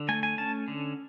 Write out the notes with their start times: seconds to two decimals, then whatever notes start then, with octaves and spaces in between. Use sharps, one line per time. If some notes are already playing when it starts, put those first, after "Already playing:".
Already playing: D3
0.09 A3 G#5
0.23 G#5
0.38 C#4 A5
0.68 D3